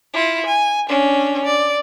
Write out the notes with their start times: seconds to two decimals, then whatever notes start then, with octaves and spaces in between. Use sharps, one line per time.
0.14 E4 F4
0.46 G#5
0.89 C#4 D4
1.45 D5